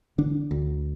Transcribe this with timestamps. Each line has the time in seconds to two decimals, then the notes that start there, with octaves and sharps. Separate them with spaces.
0.18 D3 D4
0.51 D2